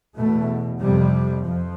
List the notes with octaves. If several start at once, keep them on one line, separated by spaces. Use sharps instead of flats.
E2 B2 A3
F2 C3 G3
F2 F3